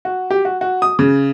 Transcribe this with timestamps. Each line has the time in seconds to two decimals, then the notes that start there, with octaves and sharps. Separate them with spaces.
0.05 F#4
0.30 G4
0.45 F#4
0.61 F#4
0.82 D#6
0.99 C#3